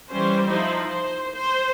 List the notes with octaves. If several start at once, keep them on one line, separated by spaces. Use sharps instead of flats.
E3 G3 C#4 C5
F3 D#4 E4 C5
C5
C5